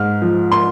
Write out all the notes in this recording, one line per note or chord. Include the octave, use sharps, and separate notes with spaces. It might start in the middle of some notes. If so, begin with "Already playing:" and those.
Already playing: G#2 F6
F3
C6